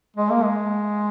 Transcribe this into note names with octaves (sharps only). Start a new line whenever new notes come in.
G#3
A#3
G#3